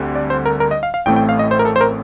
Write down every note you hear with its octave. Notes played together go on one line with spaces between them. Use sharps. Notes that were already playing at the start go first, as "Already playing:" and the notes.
Already playing: D2 D3 G3 C4
D5
C5
A#4
A#4
D#5
F5
F5
A1 A2 A3 C4 G5
G5
F5
D#5
C5
A#4
A4
C5
A#4